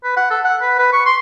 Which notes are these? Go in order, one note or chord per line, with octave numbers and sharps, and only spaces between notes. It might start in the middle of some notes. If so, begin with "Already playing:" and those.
B4
F#5
A4
F#5
B4
B4
C#6
C6